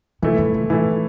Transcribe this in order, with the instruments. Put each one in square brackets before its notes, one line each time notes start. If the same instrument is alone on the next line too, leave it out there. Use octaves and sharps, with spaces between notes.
[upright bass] C3 [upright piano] E3 A3 E4
[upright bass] D3
C3
[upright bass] A2 [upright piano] E3 A3 E4